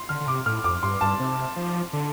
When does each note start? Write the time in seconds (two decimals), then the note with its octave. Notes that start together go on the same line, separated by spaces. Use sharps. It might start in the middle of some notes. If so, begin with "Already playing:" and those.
Already playing: C6
0.09 D3 F6
0.21 D3
0.27 C3 D6
0.46 A2 F6
0.64 F2 D6
0.83 G2 C6
1.01 G2 A5
1.20 C3
1.56 F3
1.93 D3